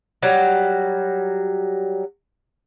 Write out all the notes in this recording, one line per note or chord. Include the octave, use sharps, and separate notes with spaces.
F#3 G3